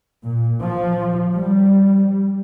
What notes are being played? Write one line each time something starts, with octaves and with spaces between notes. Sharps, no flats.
A#2
F3
G3